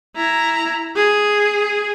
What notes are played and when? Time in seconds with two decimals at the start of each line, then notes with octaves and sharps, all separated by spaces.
0.16 E4 A#5
0.96 G#4